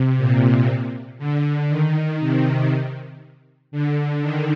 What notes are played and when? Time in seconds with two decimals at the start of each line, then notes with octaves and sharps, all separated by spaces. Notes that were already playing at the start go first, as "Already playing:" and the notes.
Already playing: C3
0.18 A#2
1.19 D3
1.69 D#3
2.20 C3
3.72 D3
4.22 D#3